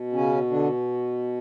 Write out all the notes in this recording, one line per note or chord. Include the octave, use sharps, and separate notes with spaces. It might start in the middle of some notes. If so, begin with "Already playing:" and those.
Already playing: B2
C#3 C#4
D3 D4